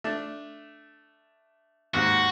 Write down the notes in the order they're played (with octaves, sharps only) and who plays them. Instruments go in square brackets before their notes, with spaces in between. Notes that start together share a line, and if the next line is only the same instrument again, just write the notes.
[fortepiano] A3 D4
[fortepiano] D#2 G#2 F#5 [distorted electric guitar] F#4